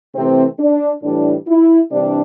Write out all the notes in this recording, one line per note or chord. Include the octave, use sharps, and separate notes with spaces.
C3 E3 A3 C4
D4
A2 E3 G3 D4
E4
C3 E3 G3 D4